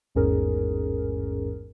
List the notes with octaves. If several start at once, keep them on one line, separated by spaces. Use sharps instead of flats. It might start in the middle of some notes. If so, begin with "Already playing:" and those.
A1 E2 G#2 C#4 G#4 A#4